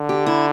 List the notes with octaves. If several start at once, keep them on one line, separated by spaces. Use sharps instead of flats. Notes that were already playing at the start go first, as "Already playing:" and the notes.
Already playing: D3
G4
E4